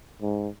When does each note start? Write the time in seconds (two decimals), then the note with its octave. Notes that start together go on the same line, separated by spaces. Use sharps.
0.22 G#2